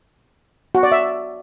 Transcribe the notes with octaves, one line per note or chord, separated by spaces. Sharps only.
F#4
D5
E5